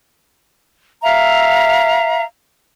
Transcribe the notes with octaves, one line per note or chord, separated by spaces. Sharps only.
E5 F5 A#5